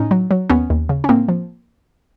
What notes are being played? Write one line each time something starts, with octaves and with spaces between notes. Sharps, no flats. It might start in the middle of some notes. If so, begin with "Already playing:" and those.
Already playing: A2 C#4 D#4
F#3
F#3
D#2 B3 C#4
D#2
C#3
C#4
A2 A#3 C4
F3